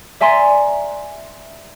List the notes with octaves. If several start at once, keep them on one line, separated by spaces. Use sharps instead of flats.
D5 E5 G#5 A#5 C6